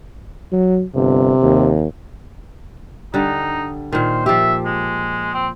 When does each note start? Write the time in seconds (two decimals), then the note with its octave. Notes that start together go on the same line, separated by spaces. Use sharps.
0.52 F#3
0.95 G1 C3
1.42 D#2
3.14 D3 G3 D#4
3.93 A#2 D#3 C5
4.26 F3 G4 E5
4.65 G#3
5.34 C4